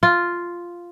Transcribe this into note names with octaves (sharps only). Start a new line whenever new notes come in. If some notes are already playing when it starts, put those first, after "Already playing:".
F4